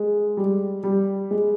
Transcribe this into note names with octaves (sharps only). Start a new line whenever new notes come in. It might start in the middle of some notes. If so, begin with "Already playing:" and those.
Already playing: G#3
G3
G3
G#3